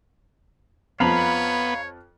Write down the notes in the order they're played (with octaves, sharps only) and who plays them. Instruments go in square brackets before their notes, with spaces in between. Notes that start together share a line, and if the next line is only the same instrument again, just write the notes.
[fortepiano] F2 F3 [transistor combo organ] B3 [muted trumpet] C#5 [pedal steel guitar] F5 A#5 B5